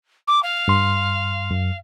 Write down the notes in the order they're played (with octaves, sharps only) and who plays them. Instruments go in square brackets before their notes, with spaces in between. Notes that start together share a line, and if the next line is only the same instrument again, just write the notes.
[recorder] D6
F5
[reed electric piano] G2 C6
F#2